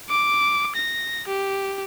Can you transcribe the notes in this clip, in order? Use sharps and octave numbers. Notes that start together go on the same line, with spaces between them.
D6
A#6
G4